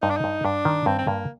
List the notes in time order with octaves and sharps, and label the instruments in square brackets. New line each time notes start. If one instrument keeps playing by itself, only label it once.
[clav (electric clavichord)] G2 [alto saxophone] D#4
[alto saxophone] D4
D#4
[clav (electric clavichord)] G2
[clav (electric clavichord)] G2 [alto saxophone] D4
[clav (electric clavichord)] D#3
[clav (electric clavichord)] G2 [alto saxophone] C4
[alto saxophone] C4
[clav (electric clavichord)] G2 [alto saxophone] A#3